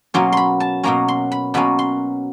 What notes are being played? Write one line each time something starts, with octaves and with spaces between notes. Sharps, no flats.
B2 F#3 A#3 C#4 C6
B5 C6
A5
B2 F#3 A#3 C#4 A#5
C6
B5
B2 F#3 A#3 C#4 B5
C6